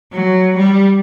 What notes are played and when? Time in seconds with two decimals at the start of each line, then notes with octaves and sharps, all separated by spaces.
0.13 F#3
0.57 G3